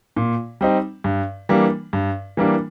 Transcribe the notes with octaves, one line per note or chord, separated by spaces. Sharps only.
A#2
G3 C4 D#4
G2
E3 G3 A#3 D4
G2
E3 G3 A#3 D4